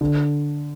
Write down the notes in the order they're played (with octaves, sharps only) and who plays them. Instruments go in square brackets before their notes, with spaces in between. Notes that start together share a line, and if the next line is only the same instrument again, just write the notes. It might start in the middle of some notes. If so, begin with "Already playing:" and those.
[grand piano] D3